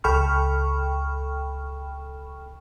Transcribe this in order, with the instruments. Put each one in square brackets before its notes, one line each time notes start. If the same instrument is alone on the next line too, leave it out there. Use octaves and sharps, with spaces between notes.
[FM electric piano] C#2 A4 G5 B5 C#6 F6